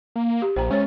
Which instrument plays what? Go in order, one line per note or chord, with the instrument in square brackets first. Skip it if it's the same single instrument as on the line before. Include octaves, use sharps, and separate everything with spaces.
[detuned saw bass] A#3
[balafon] G4
[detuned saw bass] A#1 [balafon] C5 G5 A#5
[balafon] G#3 C#5 [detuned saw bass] C#4